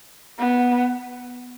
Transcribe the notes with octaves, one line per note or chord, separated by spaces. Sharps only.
B3